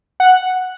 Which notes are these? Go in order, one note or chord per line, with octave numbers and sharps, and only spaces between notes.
F#5